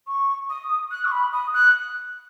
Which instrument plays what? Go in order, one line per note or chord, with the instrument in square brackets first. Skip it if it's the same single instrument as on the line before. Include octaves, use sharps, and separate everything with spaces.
[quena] C#6
D#6
F#6
C#6
B5
D#6
F#6